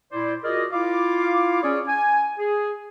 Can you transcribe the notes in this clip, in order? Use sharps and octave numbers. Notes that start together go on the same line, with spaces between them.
A#2 E4 C5 D5
F4 F#4 G#4 A#4 D5 D#5
E4 F4 F5 D6
C#4 G#4 C#5 D5
G#5
G#4